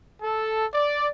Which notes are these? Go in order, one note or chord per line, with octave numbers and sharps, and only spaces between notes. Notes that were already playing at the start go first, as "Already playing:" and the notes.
A4
D5